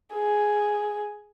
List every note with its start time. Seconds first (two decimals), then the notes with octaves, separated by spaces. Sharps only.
0.14 G#4